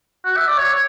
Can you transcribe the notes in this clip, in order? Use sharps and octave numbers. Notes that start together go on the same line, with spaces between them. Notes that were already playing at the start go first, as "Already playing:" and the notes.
F#4
E5
D5
C#5
C#5